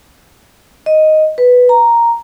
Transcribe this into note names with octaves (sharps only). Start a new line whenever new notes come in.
D#5
B4
A#5